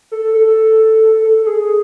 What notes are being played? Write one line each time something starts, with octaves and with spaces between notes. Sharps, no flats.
A4
A4
A4
A4
G#4